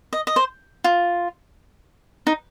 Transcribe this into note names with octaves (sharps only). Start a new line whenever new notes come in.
D#5
D#5
C5
F4
D#4